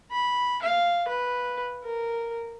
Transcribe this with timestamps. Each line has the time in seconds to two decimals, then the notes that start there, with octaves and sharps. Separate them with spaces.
0.11 B5
0.62 F5
1.08 B4
1.84 A#4